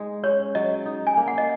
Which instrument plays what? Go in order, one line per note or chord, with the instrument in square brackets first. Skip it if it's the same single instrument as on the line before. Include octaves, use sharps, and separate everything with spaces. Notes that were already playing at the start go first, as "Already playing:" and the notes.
Already playing: [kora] G#3 D#4
[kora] C#4 [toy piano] C#5
[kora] F#3 [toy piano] D#5
[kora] D#4
[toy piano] G#5
[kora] A#3
[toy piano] F#5
D#5